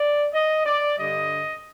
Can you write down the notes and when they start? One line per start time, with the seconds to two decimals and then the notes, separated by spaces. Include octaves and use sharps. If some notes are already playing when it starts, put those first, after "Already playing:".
Already playing: D5
0.34 D#5
0.65 D5
0.98 G2 D3 G3 D#5